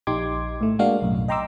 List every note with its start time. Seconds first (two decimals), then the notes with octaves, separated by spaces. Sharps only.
0.07 A#1 D#4 G4 C6 D6 G#6
0.61 A2 A3
0.79 G#3 A#3 D4 F#4 F5
1.02 B1 F#2 A2
1.28 D#5 G5 A#5 C6 D6 E6